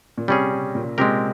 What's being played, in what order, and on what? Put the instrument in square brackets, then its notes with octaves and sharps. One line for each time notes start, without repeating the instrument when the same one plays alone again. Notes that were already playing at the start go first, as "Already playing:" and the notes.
[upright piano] A#2
[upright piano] C3 [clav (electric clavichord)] G3 C#4 G#4
[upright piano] C#3
A#2
[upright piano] C3 [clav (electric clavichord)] G#3 C4 G4 A#4